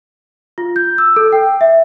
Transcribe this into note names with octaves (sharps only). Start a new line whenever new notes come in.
F4
G6
E6
A4
G5
E5